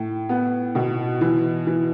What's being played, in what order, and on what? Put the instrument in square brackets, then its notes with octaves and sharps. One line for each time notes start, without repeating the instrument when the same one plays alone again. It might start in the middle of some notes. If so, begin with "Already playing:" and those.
Already playing: [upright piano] A2
B3
B2
E3
E3